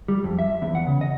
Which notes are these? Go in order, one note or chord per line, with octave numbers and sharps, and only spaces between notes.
G3
F2
E5
E2
F#5
C#3
D#5